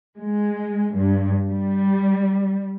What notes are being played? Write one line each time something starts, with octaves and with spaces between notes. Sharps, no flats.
G#3
G2
G3